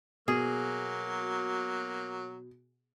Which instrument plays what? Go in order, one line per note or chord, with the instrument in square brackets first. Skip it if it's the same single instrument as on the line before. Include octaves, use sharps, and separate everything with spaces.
[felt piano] B2 [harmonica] F#3 A#3 [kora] G#4